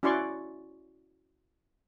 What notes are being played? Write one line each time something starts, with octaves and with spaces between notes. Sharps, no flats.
C#4 E4 F#4 D5 C6 C#6